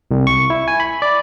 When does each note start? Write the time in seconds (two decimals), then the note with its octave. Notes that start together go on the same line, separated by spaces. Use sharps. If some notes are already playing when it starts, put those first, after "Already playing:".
0.11 C2
0.27 C#6
0.50 E4
0.68 G#5
0.80 B5
1.02 D5